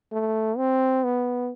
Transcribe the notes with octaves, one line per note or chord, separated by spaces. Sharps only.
A3
C4
B3